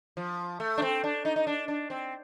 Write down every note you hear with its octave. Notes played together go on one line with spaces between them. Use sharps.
F3
A3
D4
C4
D4
D#4
D#4
D4
D4
C4